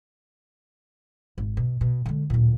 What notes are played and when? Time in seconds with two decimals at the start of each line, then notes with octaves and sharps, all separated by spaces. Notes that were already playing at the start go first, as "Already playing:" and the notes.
1.38 G#1
1.57 B2
1.81 B2
2.06 D3 G#3
2.30 D1 A#2